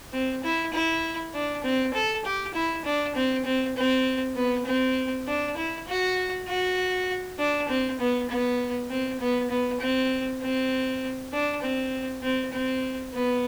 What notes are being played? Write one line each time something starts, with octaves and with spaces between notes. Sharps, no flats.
C4
E4
E4
D4
C4
A4
G4
E4
D4
C4
C4
C4
B3
C4
D4
E4
F#4
F#4
D4
C4
B3
B3
C4
B3
B3
C4
C4
D4
C4
C4
C4
B3